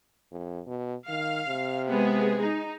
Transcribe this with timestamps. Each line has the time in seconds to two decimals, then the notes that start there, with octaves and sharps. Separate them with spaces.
0.31 F2
0.67 B2
1.08 D#3 F5
1.48 C3
1.89 G#3 B3 G#4
2.41 D#4